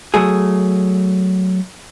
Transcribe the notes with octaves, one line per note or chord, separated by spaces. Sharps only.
F#3 A3 G#4